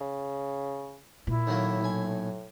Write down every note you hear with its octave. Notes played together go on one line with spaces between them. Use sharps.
C#3
A#2 E4
A2 D#3 F#3 A#3
B1 G#5